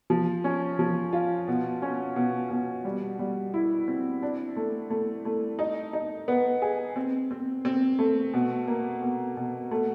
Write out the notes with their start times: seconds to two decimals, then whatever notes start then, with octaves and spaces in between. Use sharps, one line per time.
0.10 F3
0.44 C#4
0.79 F3
1.13 F4
1.48 B2
1.82 C#4
2.16 B2
2.51 B2
2.85 G3
3.19 G3
3.54 E4
3.88 C4
4.23 D4
4.56 A3
4.90 A3
5.25 A3
5.59 D#4
5.93 D#4
6.28 B3
6.62 G#4
6.96 C4
7.31 C4
7.65 C4
7.99 A3
8.34 B2
8.67 A#3
9.03 B2
9.37 B2
9.71 A3